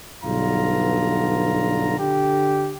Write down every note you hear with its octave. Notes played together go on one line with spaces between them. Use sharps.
B1 G2 D3 F4 A#5
D3 G4